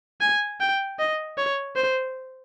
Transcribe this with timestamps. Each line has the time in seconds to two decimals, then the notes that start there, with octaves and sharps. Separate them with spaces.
0.21 G#5
0.60 G5
0.99 D#5
1.38 C#5
1.76 C5